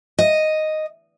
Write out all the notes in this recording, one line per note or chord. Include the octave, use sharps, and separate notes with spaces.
D#5